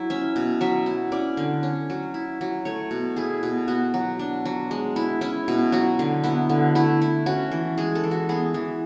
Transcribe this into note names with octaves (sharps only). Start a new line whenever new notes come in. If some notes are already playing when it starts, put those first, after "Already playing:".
Already playing: F#3 E4
C#4 E5
B2
F#3 E5
E4
C#4 D5
D3
C#4
F#3
E4
F#3
A3 C#5
B2
E4 G#4
B2
B3 F#4
F#3
D4
F#3
G#3
E4
C#4 E4
B2
F#3 F#4
D3
B3 E4
D3
A3 E4
E4
C#4 F#4
E3
G#3 G#4
A4
E3
F#4
B3 G#4
E3